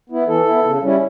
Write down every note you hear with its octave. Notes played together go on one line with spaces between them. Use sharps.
B3 E4
E3 A4
B3 E4
C#3
G3 C#4 E4